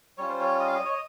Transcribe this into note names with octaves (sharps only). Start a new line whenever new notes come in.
G3 C#4 F4 C#5
C5
C#5
D#5
F5
D#5
C#5
D#5